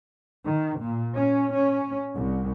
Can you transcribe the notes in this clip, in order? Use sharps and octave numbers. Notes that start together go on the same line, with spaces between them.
D#3
A#2
C#4
C#4
C2